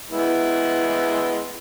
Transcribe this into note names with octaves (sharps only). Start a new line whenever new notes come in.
G#3 B3 E4